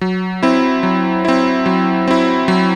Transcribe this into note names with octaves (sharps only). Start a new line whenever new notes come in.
F#3
C4 E4
F#3
C4 E4
F#3
C4 E4
F#3